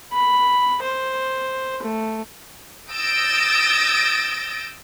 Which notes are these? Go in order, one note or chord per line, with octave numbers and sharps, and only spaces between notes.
B5
C5
A3
D#6 E6 G6 A6 A#6 D7